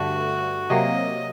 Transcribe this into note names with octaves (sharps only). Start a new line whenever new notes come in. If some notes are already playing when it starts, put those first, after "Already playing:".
Already playing: G2 D3 A3 F#4
C3 F#3 A#3 D#5